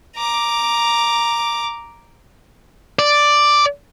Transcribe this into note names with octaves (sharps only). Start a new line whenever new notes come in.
A#5 D6
D5